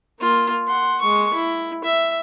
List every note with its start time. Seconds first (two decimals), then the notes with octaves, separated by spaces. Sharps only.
0.20 A#3 F4
0.67 F#5 C6
1.01 G#3 C#6
1.34 E4
1.84 E5